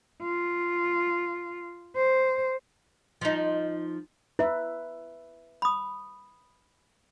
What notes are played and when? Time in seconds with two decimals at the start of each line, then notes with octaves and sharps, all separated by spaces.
0.23 F4
1.96 C5
3.21 F3 D#4
4.39 E4 B4 E5
5.62 B5 D#6